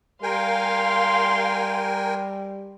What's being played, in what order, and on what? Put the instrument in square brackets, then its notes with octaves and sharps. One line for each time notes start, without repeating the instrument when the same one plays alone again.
[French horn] G3 [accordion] A#4 G5 G#5 [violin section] F5 [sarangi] C6